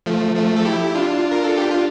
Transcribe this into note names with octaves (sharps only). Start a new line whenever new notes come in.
F3 A3
F3 A3
A4
E4 G4
D4 F4
A#4
A4
G4
F4